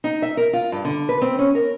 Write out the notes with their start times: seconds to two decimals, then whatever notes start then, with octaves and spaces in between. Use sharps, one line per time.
0.04 D#4
0.22 E5
0.37 A#4
0.53 F4
0.72 G2
0.85 D3
1.09 B4
1.22 C4
1.39 C#4
1.55 A#4